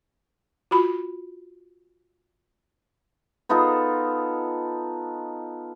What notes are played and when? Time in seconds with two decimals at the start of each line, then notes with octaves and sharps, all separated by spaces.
0.71 F4 F#4 B5
3.49 B3 D#4 F4 A4